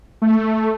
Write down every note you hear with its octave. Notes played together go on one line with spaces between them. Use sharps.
A3